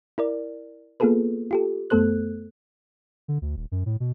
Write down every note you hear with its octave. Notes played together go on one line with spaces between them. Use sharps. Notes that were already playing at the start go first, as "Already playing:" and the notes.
E4 A#4 D5
A#3 B3 F4 G#4 A4 B4
F4 G4 A4
F#2 A3 B3 A4 C5 F#6
D3
D2
D#1
F#2
A2
B2